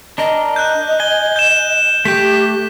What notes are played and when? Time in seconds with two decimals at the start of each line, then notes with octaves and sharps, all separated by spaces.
0.18 D4 A#4 D#5
0.56 F#6 G6
1.00 G#5 G7
1.36 G6 E7
2.05 A3 G4 G5 B6